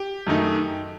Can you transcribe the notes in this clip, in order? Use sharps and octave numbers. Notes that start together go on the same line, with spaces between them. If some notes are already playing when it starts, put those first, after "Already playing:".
Already playing: G4
F#2 D#3 A3 D#4